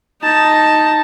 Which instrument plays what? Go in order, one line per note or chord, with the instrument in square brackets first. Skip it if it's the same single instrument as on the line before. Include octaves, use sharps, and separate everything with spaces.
[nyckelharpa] D#4 A5